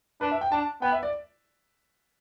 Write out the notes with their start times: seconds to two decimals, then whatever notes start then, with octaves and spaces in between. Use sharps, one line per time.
0.21 D4 B4
0.32 E5
0.41 G5
0.52 D4 A5
0.82 B3 G5
0.92 E5
1.03 D5